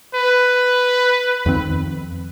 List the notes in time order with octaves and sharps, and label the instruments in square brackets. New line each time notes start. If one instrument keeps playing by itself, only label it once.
[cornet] B4
[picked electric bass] F2 D#3 C4